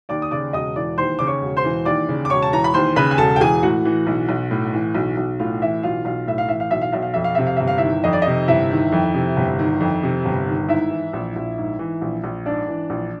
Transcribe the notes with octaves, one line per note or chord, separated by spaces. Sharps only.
D#2 D5 D6
D#6
C#3 D5 D6
E1 D#5 D#6
E3 D5 D6
D#2 C5 C6
C#3 D6
C#5 C#6
E1
C5 C6
E3
D#2 D5 D6
C#3
D6
E1 C#5 C#6
A5
E3 A#5
B5
D#2 C5 C6
C#3 B4 B5
G#5
E1 A4 A5
G5
E3 G#4 G#5
A2 F#4 F#5
E3
B1
B1
A2
E3
B1
B1
A2 F4 F5
E3 E4 E5
B1 F4 F5
B1 F4 F5
A2 E5
F5
E3 E5
F5
B1 E5
F5
B1 E5
F5
F2 E5
F5
C3 E5
F5
G1 E5
F5
D#3 E4 E5
F2 D#5
D5
C3 D#4 D#5
G1 E4 E5
D#3
F2
C3
G1
D#3
F2
C3
G1
D#3
G#2 E4 E5
E3
A#1
A#1
G#2
E3
A#1
A#1
G#2 D4 D5
E3
A#1